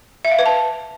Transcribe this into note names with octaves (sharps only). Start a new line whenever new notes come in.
E5
F5
B4
A5